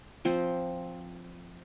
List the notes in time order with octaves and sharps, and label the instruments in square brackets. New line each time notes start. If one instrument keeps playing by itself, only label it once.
[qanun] F3 C4 C5